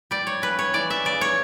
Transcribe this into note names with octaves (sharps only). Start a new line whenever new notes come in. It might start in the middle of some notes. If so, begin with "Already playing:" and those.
G3 D5
C#5
C#3 B4
C#5
E3 D5
E5
C#3 D5
C#5